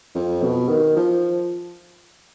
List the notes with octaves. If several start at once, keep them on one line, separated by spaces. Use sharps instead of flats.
F2
B2
D#3
F3